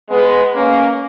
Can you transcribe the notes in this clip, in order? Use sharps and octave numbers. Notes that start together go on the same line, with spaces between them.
G#3 B3
A#3 C#4